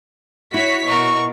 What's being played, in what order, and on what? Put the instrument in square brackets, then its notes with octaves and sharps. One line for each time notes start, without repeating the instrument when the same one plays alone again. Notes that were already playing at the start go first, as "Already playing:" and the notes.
[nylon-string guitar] E4 [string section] F#4 C#5 B6
[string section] B2 [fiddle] F#4 A#4 [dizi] C#6